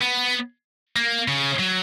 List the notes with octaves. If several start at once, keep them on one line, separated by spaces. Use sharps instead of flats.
B3
A#3
C#3
F#3